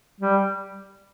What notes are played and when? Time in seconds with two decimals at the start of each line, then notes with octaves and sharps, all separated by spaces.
0.20 G3